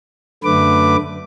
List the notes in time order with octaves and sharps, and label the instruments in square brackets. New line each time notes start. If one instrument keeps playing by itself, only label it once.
[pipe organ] F#2 D3 A3 B4 D6